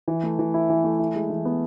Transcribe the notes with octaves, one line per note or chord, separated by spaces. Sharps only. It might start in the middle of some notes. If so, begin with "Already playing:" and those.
E3
A3
E3
E4
E3
A3
E4
G#3
E3
B3